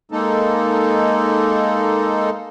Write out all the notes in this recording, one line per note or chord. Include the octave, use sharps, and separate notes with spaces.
G#3 A#3 D#4 A4